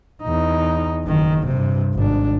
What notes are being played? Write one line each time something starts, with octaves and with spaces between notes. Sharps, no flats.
E2 D#4
F#1 D#3
G2 C3
G#1 D4